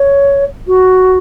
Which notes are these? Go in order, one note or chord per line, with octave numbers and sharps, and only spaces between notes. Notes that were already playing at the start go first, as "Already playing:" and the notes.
Already playing: C#5
F#4